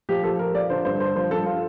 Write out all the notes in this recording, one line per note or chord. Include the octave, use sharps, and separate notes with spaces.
F3 G4
F3 A4
F3 A#4
F3 D5
D3 C5
G2 C5
G2 C5
F3 C5
G2 A4
F4